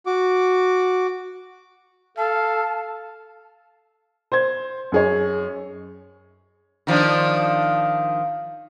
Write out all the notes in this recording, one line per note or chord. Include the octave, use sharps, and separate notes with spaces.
F#4 D6
A4 F5 A5
C5 G#6
F#2 G#4 C#5
D#3 F3 D4